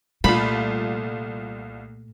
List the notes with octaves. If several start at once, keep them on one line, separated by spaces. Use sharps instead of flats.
C2 A#2 A3 F4 B5